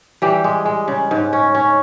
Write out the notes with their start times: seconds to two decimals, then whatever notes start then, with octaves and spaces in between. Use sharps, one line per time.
0.22 E3 G3 G4
0.44 G#3
0.66 G#3
0.88 C#3
1.11 G#2
1.33 C#4
1.55 C#4